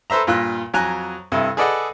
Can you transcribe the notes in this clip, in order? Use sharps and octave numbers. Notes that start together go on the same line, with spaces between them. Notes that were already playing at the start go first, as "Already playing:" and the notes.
A4 B4 C5 E5 A#5
G2 A#2 F4 E6 F#6
F2 F#3 G#5 A#5 F#6
G2 C3 E4 A4
G#4 A4 B4 D5 D#5 F#5